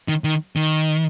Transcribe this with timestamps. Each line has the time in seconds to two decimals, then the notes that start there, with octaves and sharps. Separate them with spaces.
0.08 D#3
0.24 D#3
0.56 D#3